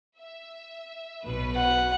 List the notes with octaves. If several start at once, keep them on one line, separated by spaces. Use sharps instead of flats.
E5
B1 B2 B4
F#5